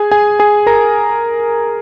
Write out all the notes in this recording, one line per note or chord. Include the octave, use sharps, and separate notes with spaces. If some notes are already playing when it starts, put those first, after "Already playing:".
Already playing: G#4 G#5
G#4 G#5
G#4 G#5
A#4 A#5